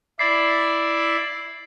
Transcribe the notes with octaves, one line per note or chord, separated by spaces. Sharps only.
E4 D5 B5 C7